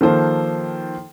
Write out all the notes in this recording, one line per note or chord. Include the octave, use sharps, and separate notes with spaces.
D#3 F3 A#3 A4 C5